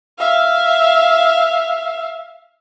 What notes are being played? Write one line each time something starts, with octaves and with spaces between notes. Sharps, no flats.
E5 F5